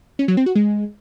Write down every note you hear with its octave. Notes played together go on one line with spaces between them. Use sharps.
C#4
F#3
C4
F#4
G#3